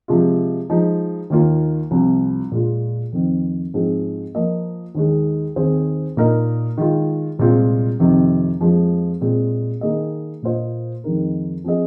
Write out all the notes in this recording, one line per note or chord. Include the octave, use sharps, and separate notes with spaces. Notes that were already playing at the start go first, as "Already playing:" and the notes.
C3 F3 G#3 F4
F3 G#3 D#4
D#2 D#3 A#3 F4
C2 C3 F3 C4 F4
A#2 G#3 F4
F2 D#3 C4
G#2 F3 G#3 C4 G#4
F3 A#3 F4 A#4 D#5
D#2 D#3 G#3
D#2 D#3 C4 G#4 C5
A#2 A#3 D#4 A#4 D#5
D#3 G#3 F4
C2 A#2 G#3 C4 F4
F2 C3 D#3
F2 F3 G#3 F4
A#2 G#3 C4
D#3 A#3 G#4 D#5
A#2 A#3 F4 C5 D#5
F2 D#3 G#3 D#4 A#4
F3 C4 G#4 D#5